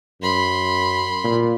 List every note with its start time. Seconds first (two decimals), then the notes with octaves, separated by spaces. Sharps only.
0.22 F#2 B5 C6
1.24 A#2